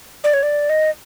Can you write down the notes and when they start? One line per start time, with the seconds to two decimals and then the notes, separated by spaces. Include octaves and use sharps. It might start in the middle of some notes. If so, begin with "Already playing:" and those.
0.24 D5
0.34 C#5
0.43 D5
0.70 D#5